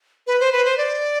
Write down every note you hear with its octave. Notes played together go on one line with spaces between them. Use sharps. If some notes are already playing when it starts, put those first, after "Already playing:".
B4
C5
B4
C5
D5